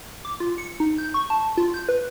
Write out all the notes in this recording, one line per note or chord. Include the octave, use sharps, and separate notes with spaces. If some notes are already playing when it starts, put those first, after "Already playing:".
D6
F4
C#7
D#4
G6
C#6
A5
F4
G6
B4